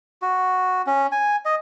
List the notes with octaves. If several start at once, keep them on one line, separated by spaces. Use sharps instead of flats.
F#4
C#4
G#5
D#5